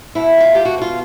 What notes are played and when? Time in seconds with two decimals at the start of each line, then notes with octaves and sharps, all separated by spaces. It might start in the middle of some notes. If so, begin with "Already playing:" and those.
0.15 B2 E4
0.40 F4
0.55 G4
0.65 B2 F#4
0.78 F#4
0.82 F4